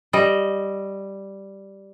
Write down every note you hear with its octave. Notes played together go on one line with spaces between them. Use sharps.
G3 D#5